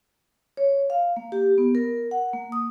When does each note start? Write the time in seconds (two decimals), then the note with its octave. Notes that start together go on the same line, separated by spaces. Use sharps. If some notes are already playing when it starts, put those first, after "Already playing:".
0.57 C#5
0.90 F5
1.17 A#3
1.32 G4
1.58 B3
1.75 A#4
2.11 F#5
2.34 A#3
2.52 D#6